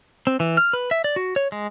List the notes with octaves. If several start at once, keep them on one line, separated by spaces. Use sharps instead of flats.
C4
E3
F6
B4
E5
D5
F#4
C#5
G#3